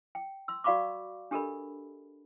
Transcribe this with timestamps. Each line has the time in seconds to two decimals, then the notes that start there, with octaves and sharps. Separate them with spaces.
0.15 G5
0.48 C6 E6
0.64 F#4 D5 F5 B5 C#6 D6
1.31 D4 G4 A4 A#4 D#5 B5